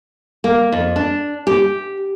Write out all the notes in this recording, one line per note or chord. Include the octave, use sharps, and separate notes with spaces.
A#3
F2
D4
G4